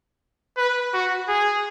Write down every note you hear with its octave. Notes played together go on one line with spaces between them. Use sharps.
B4
F#4
G#4